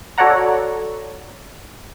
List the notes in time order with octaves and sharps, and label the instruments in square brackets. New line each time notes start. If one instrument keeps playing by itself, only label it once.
[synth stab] F#4 A4 C#5 D5 F#5 A#5